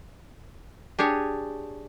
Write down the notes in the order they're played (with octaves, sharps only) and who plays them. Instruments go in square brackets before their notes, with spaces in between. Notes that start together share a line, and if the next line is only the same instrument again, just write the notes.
[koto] D4 G4 G#4 C#5